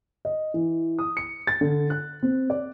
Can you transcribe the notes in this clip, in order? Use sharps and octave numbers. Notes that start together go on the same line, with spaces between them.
D#5
E3
D#6
C#7
A6
D3
F#6
C4
D5